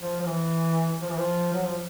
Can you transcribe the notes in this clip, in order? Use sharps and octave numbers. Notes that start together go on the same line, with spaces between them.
F3
F3
E3
F3
E3
F3
F#3
F3